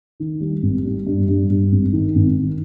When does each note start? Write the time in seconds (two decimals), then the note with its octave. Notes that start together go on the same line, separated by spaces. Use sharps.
0.20 D#3
0.40 G3
0.62 G#1
0.85 G3
1.06 G2
1.28 G2
1.50 G2
1.72 G#1
1.93 D#3
2.15 G#1
2.36 D#3